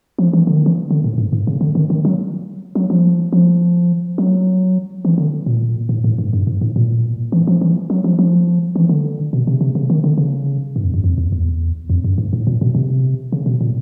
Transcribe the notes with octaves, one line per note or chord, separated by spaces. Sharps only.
F3
E3
D3
D#3
E3
D3
A2
G#2
G#2
C#3
D3
D#3
D#3
F#3
F#3
F3
F3
F#3
E3
D3
A#2
A2
A2
G#2
G2
G#2
A2
A#2
E3
F3
E3
F#3
F3
F3
E3
D3
B2
C3
C3
C#3
D#3
D3
C#3
G#2
F2
F#2
F2
E2
E2
F2
F#2
G#2
A2
A#2
B2
C3
C#3
B2
A#2